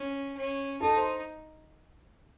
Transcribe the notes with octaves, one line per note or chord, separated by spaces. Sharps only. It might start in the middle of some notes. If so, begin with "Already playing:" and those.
Already playing: C#4
C#4
D#4 A4 A5
C5 C6